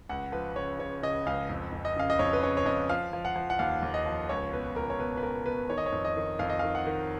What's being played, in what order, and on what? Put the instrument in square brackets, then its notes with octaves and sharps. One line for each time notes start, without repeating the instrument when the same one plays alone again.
[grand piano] C#2 F#5
F3 B4
C#3 C#5
C#3 C#5
C#3 D#5
C#2 F5
F2
F2
D#5
C#3 F5
D#5
F2 C#5
B4
C#3 C#5
C#5
F2 D#5
F3 F5
F3
F#5
F3
F#5
D#2 F5
D#2
D#5
F3
C#2 C#5
B2 B4
C#2 A#4
C#5
B2 B4
B4
C#2 A#4
B2 B4
D#3 C#5
D#5
C#5
F2
D#5
D#3
F2 F5
D#5
D#3 F5
F#5
D#3